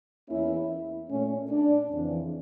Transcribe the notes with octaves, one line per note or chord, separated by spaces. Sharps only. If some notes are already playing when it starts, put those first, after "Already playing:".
E2 E3 A#3 C#4 E4
A#2 A3 C#4
D4
F2 C#3 E3